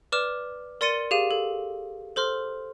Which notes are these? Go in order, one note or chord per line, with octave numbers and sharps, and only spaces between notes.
B4 D5 D6 F6 E7
A#4 D5 C6 A6 C#7 D#7
G4 G#4 F5 D#7
A4
A4 C5 C6 F6